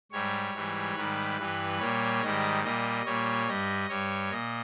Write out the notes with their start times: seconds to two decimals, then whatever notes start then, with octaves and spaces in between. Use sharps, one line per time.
0.12 G#2 G3 C#5
0.54 G#2 E3 G3
0.96 G#2 D#3 G3 B4
1.38 G2 E3 G3
1.79 A#2 G3 C#5
2.22 G#2 D#3 G3 D#5
2.63 A#2 G3 D#5
3.05 A#2 G3 C#5
3.47 G2 G3 D#5
3.89 G2 G3 C#5
4.31 A#2 D#5